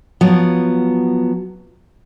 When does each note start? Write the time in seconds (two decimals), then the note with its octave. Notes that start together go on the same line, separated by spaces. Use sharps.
0.21 F3 F#3 B3